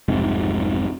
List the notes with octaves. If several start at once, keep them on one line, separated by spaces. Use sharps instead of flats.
F1 B1 G#2 C3